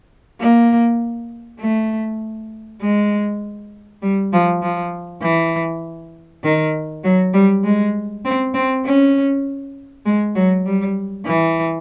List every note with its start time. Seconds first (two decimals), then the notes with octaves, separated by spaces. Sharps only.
0.40 A#3
1.60 A3
2.81 G#3
4.02 G3
4.33 F3
4.62 F3
5.22 E3
6.44 D#3
7.04 F#3
7.34 G3
7.64 G#3
8.25 C4
8.54 C4
8.85 C#4
10.06 G#3
10.35 F#3
10.66 G3
11.26 E3